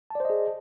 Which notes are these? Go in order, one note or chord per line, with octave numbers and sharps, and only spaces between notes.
G#4 C5 D5 D#5 A5